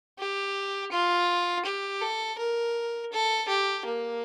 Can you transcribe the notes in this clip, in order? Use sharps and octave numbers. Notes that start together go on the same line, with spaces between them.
G4
F4
G4
A4
A#4
A4
G4
A#3